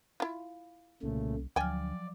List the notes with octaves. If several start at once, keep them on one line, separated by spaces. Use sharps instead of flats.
E4 F4
C2 A#2 C#3 A3
D2 F3 F#3 D5 G5 G#5 F6